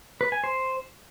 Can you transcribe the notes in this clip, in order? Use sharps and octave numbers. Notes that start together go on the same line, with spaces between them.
B4
G#5
C5